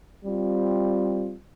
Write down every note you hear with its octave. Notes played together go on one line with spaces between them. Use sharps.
G3 C4 F4